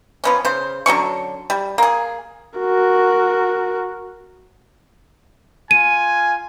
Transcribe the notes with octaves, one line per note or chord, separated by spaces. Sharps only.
F3 B3 C#4
C#3 C5
D3 F#3 C#4 C#6
G3
A#3 G#4
F#4 A#4
F4 G#5 D#7